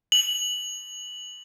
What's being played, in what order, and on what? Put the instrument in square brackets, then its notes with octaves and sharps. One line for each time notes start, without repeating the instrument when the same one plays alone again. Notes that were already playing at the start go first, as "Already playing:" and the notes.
[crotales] F#7